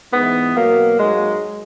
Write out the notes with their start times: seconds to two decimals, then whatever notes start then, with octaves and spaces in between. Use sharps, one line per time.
0.13 G#2 E3 B3
0.55 B2 F#3 A#3
0.99 G#2 F#3 G#3